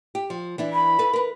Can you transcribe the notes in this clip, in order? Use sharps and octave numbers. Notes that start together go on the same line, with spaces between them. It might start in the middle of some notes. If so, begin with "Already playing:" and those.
G4
F3
E3 D4 E4
B5
A4 B4
A#4 B4